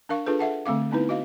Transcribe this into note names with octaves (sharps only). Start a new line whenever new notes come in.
D4 A#4 F5 C#6
D4 F4 G#4 A4 B4
A4 E5 F#5 A5
D3 A3 C4 F5 D6
B3 C4 D#4 E4 B4
F#4 D#5 F5